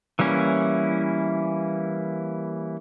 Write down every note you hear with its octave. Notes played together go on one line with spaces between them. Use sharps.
E3 G3 A#3 C#4 E4